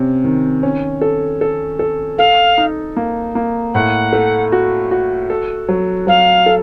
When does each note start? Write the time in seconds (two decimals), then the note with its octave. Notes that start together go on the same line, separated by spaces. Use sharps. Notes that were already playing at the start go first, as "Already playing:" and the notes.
Already playing: C3 C#4
0.24 D#3
0.63 C#4
1.01 A4
1.41 A4
1.79 A4
2.18 A4 F5
2.58 D#4
2.96 A#3
3.35 A#3
3.74 A2 F#5
4.13 A3
4.52 F#4
4.91 F#4
5.30 A4
5.68 F#3
6.07 F#3 F5
6.46 A4